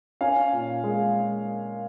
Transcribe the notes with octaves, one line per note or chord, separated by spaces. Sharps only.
C#4 F5 G#5
A#2
G#3